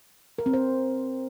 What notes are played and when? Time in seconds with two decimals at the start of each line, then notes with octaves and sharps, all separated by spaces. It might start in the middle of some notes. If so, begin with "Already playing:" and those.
0.38 A#4
0.46 C4
0.53 C5